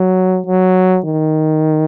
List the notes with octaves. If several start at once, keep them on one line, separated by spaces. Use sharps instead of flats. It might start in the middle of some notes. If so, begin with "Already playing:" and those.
Already playing: F#3
F#3
D#3